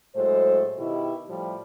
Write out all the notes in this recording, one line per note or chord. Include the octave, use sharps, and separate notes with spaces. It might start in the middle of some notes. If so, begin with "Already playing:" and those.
A2 F#3 G#3 A4 C5
B2 D#3 E4 G4
A2 F3 G3